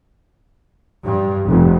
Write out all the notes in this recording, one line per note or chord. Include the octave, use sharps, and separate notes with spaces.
G2
F1